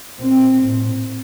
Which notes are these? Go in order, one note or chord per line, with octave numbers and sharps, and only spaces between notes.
A#2 C4
A2